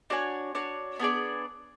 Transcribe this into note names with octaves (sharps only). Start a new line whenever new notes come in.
D4 F#4 C#5 G#5
D4 F#4 C#5
B3 D4 G#4 D5